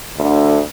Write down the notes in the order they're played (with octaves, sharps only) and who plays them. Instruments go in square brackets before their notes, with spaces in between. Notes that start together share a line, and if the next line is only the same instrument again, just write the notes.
[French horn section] D2 D3